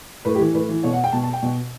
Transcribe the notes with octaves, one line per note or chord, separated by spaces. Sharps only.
A2 B4
G4
E3
A2 B4
E3
B2 C#5
F#5
G5
B2 A5
A5
G5
B2